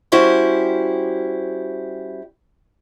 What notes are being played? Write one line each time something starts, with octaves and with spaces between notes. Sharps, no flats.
G3 C#4 E4 F#4 G4 C5